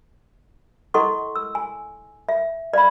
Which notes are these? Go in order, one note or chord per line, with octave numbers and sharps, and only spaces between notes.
E4 A4 D#5 F#5 C6 C#6
E6
G#5
E5
D5 F5 B5